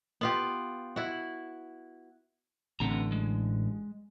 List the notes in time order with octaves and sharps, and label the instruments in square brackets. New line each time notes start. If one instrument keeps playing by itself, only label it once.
[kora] B3 F4 G4
E4 F#4
[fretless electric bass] A1 A2 D3 [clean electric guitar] B3 C4 A#5
[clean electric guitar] G#3